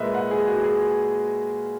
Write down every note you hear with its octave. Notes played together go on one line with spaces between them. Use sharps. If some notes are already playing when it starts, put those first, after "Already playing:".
Already playing: A#2 G#3 A#4 B4 D#5 E5
F#5
G#4
F#4
G#4